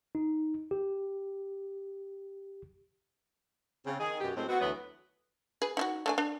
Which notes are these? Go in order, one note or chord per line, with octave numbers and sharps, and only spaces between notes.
D#4
G4
C#3 C4
D#3 G#4
F#2 B2 G4
A2 F#3 G#3 C4
B3 C4 F#4
D2 E3 F#3 B3
G#4 B4
D#4 E4 F#4
A3 D4 G#5
D4